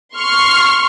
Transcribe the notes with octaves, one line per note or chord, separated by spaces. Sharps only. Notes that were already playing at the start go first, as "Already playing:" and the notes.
C6 C#6 F6